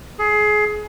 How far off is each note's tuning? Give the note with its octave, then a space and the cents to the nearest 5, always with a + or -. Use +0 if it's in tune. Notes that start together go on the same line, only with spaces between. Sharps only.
G#4 +25